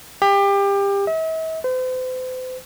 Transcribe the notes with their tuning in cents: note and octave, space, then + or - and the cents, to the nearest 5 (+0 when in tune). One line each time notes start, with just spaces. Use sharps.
G4 +25
E5 -45
C5 -40